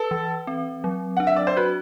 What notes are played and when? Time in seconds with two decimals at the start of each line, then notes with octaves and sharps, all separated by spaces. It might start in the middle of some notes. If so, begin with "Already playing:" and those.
Already playing: A4 B4
0.11 E3
0.47 C4
0.84 F#3
1.17 D4 F#5
1.27 E5
1.36 D5
1.47 C5
1.57 F#4 B4